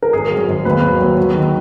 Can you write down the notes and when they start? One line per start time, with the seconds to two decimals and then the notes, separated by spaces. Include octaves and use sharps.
0.03 A#4
0.13 G#1 G#4
0.31 F#3
0.48 G#1
0.65 D#2 B4
0.82 F#3
1.00 F#3
1.17 F#3
1.35 D#3